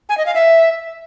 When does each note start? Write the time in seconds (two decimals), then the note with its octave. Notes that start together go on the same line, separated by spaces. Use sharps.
0.09 G#5
0.18 D#5
0.26 F5
0.35 E5